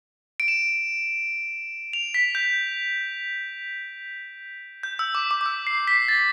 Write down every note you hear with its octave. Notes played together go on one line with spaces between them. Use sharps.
D7
E7
F7
B6
G6
G6
E6
D6
D6
D6
E6
C7
B6
A6